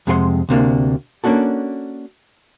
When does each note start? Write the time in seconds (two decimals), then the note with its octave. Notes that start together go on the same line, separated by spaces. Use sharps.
0.07 F2 C3 G#3 G#4 F#5 C6
0.49 D2 C3 A#3 D4
1.24 A#3 C#4 D4 F#4 A4